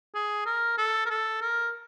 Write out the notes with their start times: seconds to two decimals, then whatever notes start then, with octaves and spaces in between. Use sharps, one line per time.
0.15 G#4
0.46 A#4
0.78 A4
1.06 A#4
1.10 A4
1.41 A#4